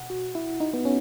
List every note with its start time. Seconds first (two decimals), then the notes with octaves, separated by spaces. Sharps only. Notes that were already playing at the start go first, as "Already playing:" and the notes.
Already playing: B2 F#5
0.10 F#4
0.35 E4
0.60 D#4
0.74 B3
0.85 C#4